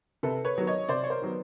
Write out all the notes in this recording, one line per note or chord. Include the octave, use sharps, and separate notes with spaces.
C3 A4 B4
B4 C#5
D#3 F#3 B3
C#5 D#5
C3 C5 D5
C#5
A#4 C5
D#3 F#3 B3